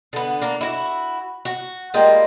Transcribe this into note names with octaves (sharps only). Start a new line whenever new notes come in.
D3 B3
A#3 D4
E4 F#4
F#4
G3 G#3 A#3 F4